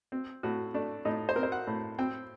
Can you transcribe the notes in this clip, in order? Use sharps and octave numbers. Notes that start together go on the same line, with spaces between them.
C4
A2 F#4
A3 D4
A2 D#4
C5
C4 A#4
C5
F#5
A2
C4 G5